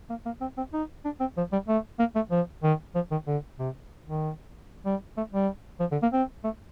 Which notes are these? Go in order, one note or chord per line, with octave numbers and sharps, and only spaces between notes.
A#3
A#3
C4
C4
D#4
D4
C4
F3
G3
A3
A#3
A3
F3
D#3
F3
D#3
D3
C3
D#3
G3
A3
G3
F3
D3
A#3
C4
A3